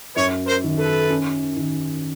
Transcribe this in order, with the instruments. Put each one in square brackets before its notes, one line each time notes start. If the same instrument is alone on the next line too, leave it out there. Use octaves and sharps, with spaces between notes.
[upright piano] F#2 [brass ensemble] B4 C#5
[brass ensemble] A#4 C5
[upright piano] D#3
[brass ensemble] A4 B4
[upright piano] C#4
D#3